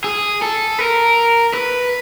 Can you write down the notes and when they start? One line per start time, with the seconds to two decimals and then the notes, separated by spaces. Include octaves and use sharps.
0.04 G#4
0.42 A4
0.79 A#4
1.54 B4